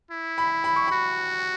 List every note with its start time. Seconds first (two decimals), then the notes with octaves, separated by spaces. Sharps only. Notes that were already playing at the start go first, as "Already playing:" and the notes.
0.11 E4
0.38 B5
0.64 B5
0.76 C#6
0.88 F#4 B5